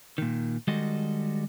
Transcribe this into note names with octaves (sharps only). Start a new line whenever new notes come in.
A#2 D#3
D#3 G3 G#3 F#4 A4 D#5